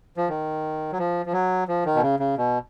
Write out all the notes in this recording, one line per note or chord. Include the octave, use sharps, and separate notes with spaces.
F3
D#3
F#3
F3
F3
F#3
F3
D#3
B2
C#3
C#3
B2